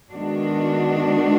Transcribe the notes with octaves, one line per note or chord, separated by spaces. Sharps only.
D#3 G#3 B3 D4 F#4